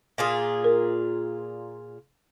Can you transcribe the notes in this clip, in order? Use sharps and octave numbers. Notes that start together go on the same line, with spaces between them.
A#2 F4 G#4
A#4